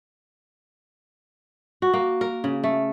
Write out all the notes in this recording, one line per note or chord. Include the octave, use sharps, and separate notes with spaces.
F#4
A#3
A#4
C#3
A3